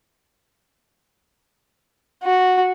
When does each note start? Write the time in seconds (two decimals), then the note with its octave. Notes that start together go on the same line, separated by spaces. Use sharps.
2.23 F#4